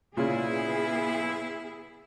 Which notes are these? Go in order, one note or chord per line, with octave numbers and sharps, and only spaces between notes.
A#2 C#3 B3 E4 G#4